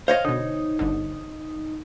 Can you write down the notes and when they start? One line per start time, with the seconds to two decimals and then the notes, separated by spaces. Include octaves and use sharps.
0.08 C5 C#5 D#5 F5
0.25 B2 D3 D#4
0.79 G1 D3